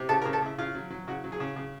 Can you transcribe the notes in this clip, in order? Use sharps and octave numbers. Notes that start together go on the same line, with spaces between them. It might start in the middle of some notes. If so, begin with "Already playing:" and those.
Already playing: C3
C#3 A4
A#4
C#3
A4
C#3 E4
C#3 F4
F#3
F#3
C#3 F#4
F#3
G#4
C#3
C#3